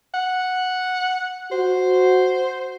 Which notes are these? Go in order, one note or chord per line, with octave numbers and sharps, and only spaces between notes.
F#5
F#4 C5